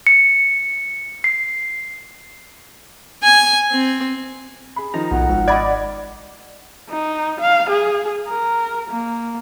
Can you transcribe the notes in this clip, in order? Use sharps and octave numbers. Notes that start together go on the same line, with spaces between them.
C#7
C7
G#5
C4
G#4 B5
D#3 F3 D#4 A#5
B1 A2 F#5
G#1 F6
D5 D#5 B5 G#6
D#4
F5
G#4
A#4
A#3